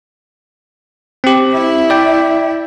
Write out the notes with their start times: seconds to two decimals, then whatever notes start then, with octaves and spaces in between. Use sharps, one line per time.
1.24 C4 G4
1.53 E4 E5
1.90 D5 G5